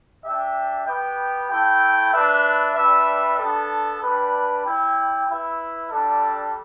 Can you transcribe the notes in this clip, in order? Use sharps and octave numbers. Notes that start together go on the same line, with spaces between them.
D4 G4 E5 G5
B3 G4 B4 G5
A3 E4 A4 G5
D4 B4 E5
G3 D4 B4 E5
B3 D4 A4
G3 D4 B4
G3 E4 G4 E5 G5
E4 B4 E5
G3 D4 A4